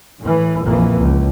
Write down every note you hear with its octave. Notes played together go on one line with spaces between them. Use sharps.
A2 E3
A#1 F2 E3 A#3
C#2